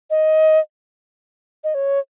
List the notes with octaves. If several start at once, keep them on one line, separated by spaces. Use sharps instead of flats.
D#5
D#5
C#5